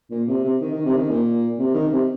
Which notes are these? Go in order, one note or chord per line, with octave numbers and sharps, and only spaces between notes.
A#2
C3
C3
D#3
D#3
C3
D#3
A#2
C3
D#3
C3